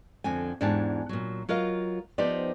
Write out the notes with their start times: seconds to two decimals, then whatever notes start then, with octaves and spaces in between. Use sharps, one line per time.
0.24 F2 D3 C4 G#5
0.61 E2 G#2 D4 G4 G#5 A5
1.09 A#2 F#3
1.49 F#3 F4 A#4 D#5 F5
2.18 F3 B3 D#4 G4 C5 D5